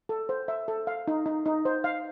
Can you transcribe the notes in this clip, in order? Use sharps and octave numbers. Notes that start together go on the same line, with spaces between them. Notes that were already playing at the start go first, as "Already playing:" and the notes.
A4
C5
E5
A4
F5
D#4
D#4
D#4
C5
F5